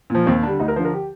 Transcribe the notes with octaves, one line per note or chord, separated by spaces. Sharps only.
A#2 F3
D#2 C4
D3 G3 D4
D2 D#4
A#4
D3 F3 C5
A#4
G4